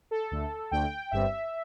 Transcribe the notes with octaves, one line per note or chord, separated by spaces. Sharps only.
A4
D2 D3 A3
D2 D3 A3 G5
G1 G2 G3 C4 E5